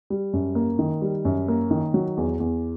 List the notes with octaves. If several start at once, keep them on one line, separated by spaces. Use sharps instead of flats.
G3
F#2
A#3
D#3
G3
F#2
A#3
D#3
F#3
E2
E2